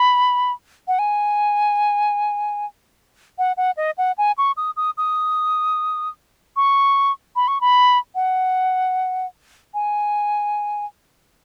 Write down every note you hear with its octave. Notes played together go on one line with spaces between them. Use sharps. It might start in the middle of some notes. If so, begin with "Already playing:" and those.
Already playing: B5
F#5
G#5
F#5
F#5
D#5
F#5
G#5
C#6
D#6
D#6
D#6
C#6
B5
C#6
B5
F#5
G#5